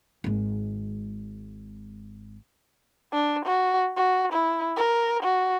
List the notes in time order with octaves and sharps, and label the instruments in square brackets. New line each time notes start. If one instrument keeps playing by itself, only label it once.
[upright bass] G#1 G#3
[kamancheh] D4
F#4
F#4
E4
A#4
F#4